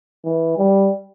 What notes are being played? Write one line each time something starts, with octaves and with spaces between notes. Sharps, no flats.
E3
G3